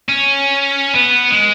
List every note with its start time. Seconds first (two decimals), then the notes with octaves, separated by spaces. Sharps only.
0.09 C#4
0.95 B3
1.30 G#3